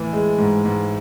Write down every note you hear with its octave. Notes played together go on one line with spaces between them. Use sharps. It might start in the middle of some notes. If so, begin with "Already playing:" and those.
Already playing: A2 E3
G#3
G#2
G#2